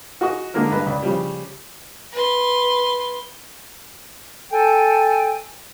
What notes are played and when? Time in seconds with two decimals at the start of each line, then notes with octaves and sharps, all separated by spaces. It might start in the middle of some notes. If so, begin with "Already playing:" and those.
0.21 F#4 G#4 D#5 C#6 D#6
0.54 D3 G#3 A#3 D#4 A#4
0.72 G2 B4 D#5
0.86 C#2 D5
1.02 C#3 F3 G3
2.12 B4 C6
4.51 A4 G5 G#5